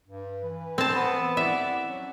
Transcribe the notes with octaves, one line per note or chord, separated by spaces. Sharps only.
G2
E3 B4
C4 A5
B3
E4 G4 D5 E5 F#5
F#3 C#4